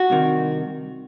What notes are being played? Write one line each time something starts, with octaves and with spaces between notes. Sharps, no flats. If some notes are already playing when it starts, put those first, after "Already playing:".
Already playing: F#4
C2 C3 D#3